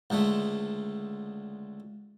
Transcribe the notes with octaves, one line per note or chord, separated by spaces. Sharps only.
C#2 D3 G#3 A3